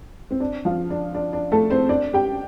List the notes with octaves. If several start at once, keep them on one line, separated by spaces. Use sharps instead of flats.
C4
D4
F3 F4
D4
D4
D4
A3 A4
C4 C5
D4 D5
G4 G5